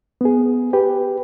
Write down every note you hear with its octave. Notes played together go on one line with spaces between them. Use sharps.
B3 G#4
G4 B4